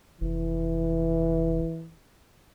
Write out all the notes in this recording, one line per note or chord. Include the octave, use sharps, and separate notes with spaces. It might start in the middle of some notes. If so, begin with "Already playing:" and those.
F1 E3